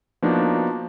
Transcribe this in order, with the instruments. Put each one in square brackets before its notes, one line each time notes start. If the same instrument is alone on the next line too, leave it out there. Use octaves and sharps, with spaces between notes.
[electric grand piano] F3 A#3 B3 D4 D#4 F#4